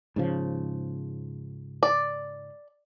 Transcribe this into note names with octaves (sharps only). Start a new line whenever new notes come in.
G#2 C#3 F3
D5